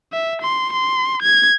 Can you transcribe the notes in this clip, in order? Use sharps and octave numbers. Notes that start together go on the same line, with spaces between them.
E5
C6
C6
G#6